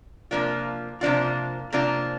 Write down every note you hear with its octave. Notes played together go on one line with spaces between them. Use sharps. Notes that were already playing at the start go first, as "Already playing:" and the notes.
C3 F3 A#3 D4 F4
C3 F3 A#3 D4 F4
C3 F3 A#3 D4 F4